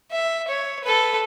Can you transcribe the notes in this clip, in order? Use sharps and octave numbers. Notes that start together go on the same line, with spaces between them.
E5
C#5
A4 B4